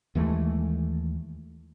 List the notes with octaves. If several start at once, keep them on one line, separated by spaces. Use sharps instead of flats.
D#2 E3 G#3 A3